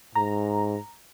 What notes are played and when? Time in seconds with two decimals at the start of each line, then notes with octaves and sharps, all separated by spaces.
0.15 G#2 A#5